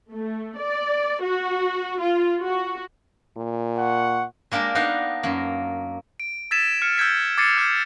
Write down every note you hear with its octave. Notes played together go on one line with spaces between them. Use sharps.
A3
D5
F#4
F4
F#4
A#2
F#5 C#6
G#3 A#3 D4 G4 A#4
B3 D4 D#4 F5
F#2 A#3
D7
E6 G#6 A6 B6 D#7 E7
F6 C#7
E6 G6 G#6 B6
D6 G#6 A6 C7 C#7 D#7
D6 F6 G6